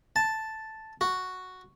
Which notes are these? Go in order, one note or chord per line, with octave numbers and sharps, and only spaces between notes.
A5
F#4